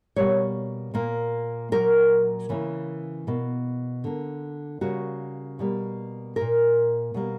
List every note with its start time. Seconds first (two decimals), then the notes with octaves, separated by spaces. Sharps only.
0.16 B2 G3 A#3 C#5
0.94 A#2 A#3
1.72 A#2 F#3 A#3 A#4
2.49 C#3 E3 A#3
3.27 B2 A#3
4.04 D3 A#3
4.81 C#3 G3 A#3 F#4
5.59 B2 G3 A#3
6.36 A#2 A#3 A#4
7.14 B2 G3 A#3